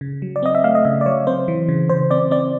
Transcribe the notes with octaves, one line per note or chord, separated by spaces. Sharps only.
C#3
F#3
D5
C4 D#5
E5
A3 F5
D#5
C#3 E5
D5
F#3 C#5
C4 C5
E3
C#3
C#3 C5
C4 D5
C4 D5